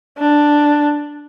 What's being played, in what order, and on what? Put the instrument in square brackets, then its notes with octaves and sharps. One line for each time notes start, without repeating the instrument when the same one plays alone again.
[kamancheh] D4